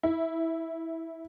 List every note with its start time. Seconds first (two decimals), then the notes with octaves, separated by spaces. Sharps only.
0.03 E4